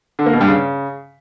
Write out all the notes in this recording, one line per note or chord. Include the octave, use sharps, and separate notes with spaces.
D3
A#3
B2
G2
C#3